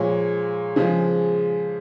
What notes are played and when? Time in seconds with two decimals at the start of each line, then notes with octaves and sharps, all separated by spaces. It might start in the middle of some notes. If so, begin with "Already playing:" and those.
Already playing: A#2 F3 G#3 C#5
0.76 C#3 F3 G#3